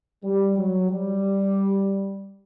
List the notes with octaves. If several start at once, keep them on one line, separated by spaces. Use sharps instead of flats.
G3
F#3
G3